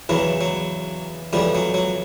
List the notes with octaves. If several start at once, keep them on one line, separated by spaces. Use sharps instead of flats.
E2 C#3 E3 F#3
F#3
F2 C#3 E3 G3
F#3
F#3